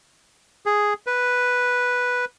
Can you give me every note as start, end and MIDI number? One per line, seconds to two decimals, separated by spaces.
0.66 0.94 68
1.07 2.25 71